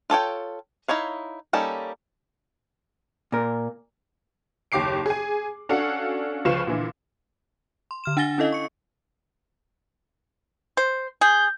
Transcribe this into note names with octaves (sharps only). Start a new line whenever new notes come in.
F4 A4 C#5 G5
D#4 E4 C#5 F5
G3 A#3 C#4 D#4 A4
A#2 A#4
F#1 D#2 G4 D6 C7 D7
G#4 G#5
C#4 D4 F#4 A4 F5 F#5
C#2 F3 B4 F5 C#6 E7
A#2 D3 E3
C6
D3 F6 E7
D4 F#5 G#5 A6 A#6 G7
C#4 E4 A4 D#5 F5
C#6 C#7
C5
G#4 G6